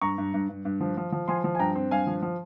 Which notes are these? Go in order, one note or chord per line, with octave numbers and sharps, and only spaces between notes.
G2 A#5 C#6
G2
G2
G2
G2
F3
F3
F3
F3 G#5 C6
F3
G#5
G2 G5 A#5
C4
G2 F5 G#5
F3
F3